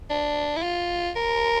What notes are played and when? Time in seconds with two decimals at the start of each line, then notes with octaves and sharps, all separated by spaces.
0.10 D4
0.56 E4
0.63 F4
1.16 A#4